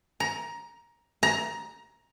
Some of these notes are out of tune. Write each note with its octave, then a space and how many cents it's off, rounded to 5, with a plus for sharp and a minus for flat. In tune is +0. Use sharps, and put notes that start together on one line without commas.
A#5 +15
A#5 +15